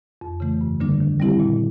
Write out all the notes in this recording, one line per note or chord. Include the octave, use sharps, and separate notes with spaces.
F2
C#3 E3 A3
G2
D3 G3 A#3 D4
D#3
G3 C4 E4 G4
A#2